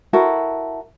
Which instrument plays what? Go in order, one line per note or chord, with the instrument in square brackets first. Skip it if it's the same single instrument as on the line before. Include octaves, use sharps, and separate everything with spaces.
[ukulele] E4 F#4 A4 A#4